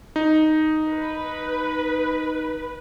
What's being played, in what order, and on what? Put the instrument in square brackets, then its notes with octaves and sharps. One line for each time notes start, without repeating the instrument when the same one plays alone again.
[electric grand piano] D#4
[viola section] B4